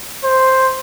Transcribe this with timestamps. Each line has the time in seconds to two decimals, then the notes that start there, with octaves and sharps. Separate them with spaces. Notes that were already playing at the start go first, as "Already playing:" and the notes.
0.24 C5